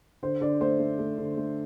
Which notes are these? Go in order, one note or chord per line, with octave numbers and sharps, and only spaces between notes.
D3 C5
D3 D5
A3 C5
A3
A3
D3
A3